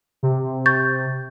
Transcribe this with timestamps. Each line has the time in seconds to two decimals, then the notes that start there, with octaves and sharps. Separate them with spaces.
0.23 C3
0.66 C#6 G6 A6